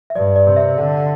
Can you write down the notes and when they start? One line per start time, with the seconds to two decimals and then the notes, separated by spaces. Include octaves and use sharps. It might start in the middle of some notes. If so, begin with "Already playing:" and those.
0.10 E5
0.16 G2 D5
0.36 D5
0.47 C3
0.57 E5
0.77 D3